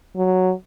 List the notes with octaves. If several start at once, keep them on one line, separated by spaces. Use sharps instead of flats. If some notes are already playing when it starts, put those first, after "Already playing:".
F#3